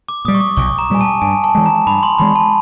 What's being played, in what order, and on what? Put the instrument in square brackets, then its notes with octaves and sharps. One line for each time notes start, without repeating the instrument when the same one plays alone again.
[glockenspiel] D6
[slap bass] A#2 [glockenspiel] D#6
[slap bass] G3
[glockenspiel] C#6
D6
[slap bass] B1 [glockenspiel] C#6
[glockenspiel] A#5
[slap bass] A#2 G3 [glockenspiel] G#5
[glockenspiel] A5
[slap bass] G2 [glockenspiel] G#5
[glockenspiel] A5
[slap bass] E3 G#3
[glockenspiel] A#5
[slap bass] G2 [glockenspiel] B5
[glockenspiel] C6
[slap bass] E3 G#3 [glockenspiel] B5
[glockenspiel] A5